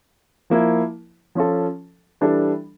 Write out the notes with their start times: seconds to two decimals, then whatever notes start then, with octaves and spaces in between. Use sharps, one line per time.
0.50 F3 A#3 E4
1.35 F3 C#4 F4 A4
2.21 E3 G3 D4 A4